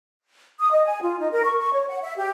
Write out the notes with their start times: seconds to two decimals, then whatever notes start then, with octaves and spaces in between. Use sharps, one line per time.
0.60 D#6
0.72 D#5
0.85 G#5
1.02 F4
1.20 D#4
1.32 A#4
1.44 C#6
1.60 C#6
1.73 C#5
1.88 F#5
2.03 E5
2.17 G4